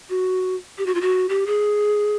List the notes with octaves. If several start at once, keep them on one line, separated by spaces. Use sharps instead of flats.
F#4
G4
F#4
F4
F#4
G4
G#4